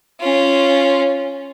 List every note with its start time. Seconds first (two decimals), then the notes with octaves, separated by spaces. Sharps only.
0.21 C#4 F4